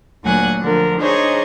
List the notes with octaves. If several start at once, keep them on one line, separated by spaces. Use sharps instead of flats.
D2 A#2 F#3 F#5 G#5 F#6
D3 F3 A#4
D4 D#4 G#4 C5 C#5 D#5